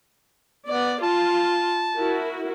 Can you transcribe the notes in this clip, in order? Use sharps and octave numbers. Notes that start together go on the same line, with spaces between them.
B3 D5
F4 A5
E4 F#4 A#4